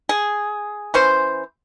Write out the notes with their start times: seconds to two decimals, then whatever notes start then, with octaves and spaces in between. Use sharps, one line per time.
0.09 G#4
0.94 E3 C#4 C5